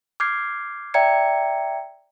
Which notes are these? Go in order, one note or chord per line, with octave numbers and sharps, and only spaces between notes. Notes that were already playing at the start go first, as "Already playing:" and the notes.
D6 F6 G6 G#6 C7
D5 E5 G5 A#5 G#6 C#7